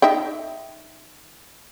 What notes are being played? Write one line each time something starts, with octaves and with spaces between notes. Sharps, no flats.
D#4 E5 G5